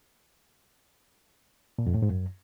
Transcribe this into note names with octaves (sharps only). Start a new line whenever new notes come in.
A#2
F2
A2
G#2
F#2